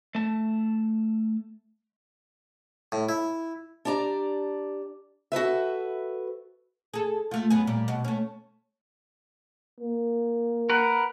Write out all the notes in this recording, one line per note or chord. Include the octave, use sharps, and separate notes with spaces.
A3 A5
A2
E4
D4 G4 D5 A#5
F#4 A4 B4 E5
G#4 A4
A3 F4
F#2 B3 G#4
A#2 G3
B2
A3 C#4
A#3
A#4 B4 F#5